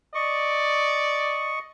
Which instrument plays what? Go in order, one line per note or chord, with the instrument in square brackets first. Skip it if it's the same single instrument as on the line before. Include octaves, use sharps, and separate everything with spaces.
[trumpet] D5 [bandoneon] D#5 C#6